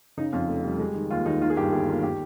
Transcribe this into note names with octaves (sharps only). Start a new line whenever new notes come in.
C#3 D#4
F2 F4
F1
G3
G#3
D#3
D#2 F4
D#2 D#4
D#3 F4
G#4
G2 G4
G1 G#4
A#3 F4
D#3 G4